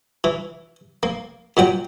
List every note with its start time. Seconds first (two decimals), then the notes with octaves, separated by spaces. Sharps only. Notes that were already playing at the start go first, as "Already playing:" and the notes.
0.24 E3
1.03 A#3
1.57 A#2 F#3 F#5 G5